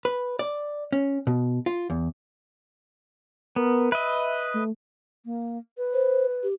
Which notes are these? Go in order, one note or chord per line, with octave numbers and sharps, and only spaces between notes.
B4
D5
C#4
B2
F4
E2
B3 A#4
B4 D#5 E5
A3
A#3
B4
C5
G4